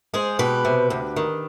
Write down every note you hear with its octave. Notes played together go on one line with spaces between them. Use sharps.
G#3 G#4 C5
B2 G4 B4
C3
D2
D#3